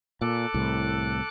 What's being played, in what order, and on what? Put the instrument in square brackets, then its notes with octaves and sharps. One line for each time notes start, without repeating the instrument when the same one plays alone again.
[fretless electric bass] A#2 [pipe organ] A4 D6 F#6
[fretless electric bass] C2 A2